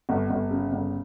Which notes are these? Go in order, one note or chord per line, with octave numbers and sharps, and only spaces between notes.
G1
G1
C#3
G1